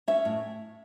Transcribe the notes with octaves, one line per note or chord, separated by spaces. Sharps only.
C#4 E5
A2